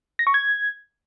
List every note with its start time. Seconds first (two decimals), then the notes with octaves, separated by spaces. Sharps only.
0.19 A#6
0.27 C#6
0.34 G#6